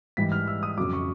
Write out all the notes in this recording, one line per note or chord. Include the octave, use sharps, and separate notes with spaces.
G#2 E3 G3 B6
F6
E6
D#6
F2 C#3 F#3 D6
C#6